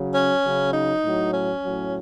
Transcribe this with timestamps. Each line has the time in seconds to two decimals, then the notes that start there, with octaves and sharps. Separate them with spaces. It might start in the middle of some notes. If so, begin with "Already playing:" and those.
Already playing: C#3 F#3
0.14 C#4
0.44 C#3 F#3
0.74 D#4
1.04 A2 F#3
1.33 C#4
1.62 A2 F#3